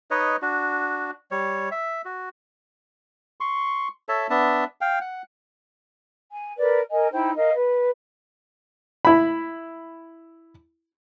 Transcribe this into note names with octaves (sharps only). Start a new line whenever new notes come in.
D#4 B4 C#5 D#5
D4 F#4
G3 C#5
E5
F#4
C6 C#6
A4 C#5 E5 A5
B3 D4 E5 A5
F5 G5
F#5
G#5
A#4 B4 D5
A#4 D#5 G#5
D#4 E4 C5 G5
A#4 D#5 F5
B4
E4 B5